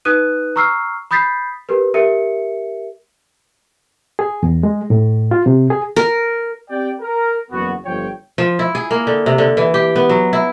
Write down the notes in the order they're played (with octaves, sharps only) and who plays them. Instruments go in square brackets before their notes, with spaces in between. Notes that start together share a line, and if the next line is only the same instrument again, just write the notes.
[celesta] D#4 B4 D#6 F#6 D#7
A#5 C#6 E6 F6 C7
B5 D#6 G6 A6 B6 C7
G4 A#4 B4
G4 A#4 E5 C#7
[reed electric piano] G#4
E2
G#3
A2
F4
C3
G#4
[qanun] A#4
[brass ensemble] C4 G4 D5 G5
A#4
F#1 E2 B3 F#4
G1 F3 C#5 G5
[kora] F3
E4
G#4
A#3
D3
C3
D3
E3
G4
B3
F#3
E4